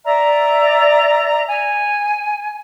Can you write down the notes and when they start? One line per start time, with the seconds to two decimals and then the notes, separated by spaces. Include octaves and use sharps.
0.04 D5 E5 A#5
1.49 G#5